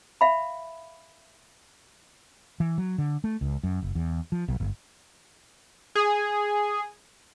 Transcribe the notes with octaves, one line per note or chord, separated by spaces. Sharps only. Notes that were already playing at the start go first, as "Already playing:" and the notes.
E5 F5 B5
E3
F#3
D3
A3
C#2
F#2
F#1
E2
F3
B1
G1
G#4